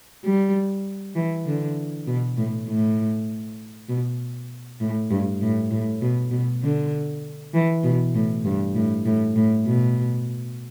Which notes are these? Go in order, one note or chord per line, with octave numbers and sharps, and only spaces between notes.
G3
E3
D3
B2
A2
A2
B2
A2
G2
A2
A2
B2
B2
D3
E3
B2
A2
G2
A2
A2
A2
B2